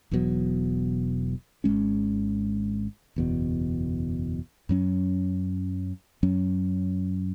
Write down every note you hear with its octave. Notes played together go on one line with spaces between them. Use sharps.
E1 E2 B2 F#3
G#1 G#2 G#3 C#4
F#1 E2 B2
F#2 F#3 C#4
F#2 F#3 C#4